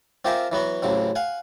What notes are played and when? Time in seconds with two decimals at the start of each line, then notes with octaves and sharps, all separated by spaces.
0.25 C4 F4 G4 A#4 E5 G#5
0.52 E3 F#3 B3 F#4
0.82 A1 C#3 F#3 C4
1.15 F5 F#5 G#5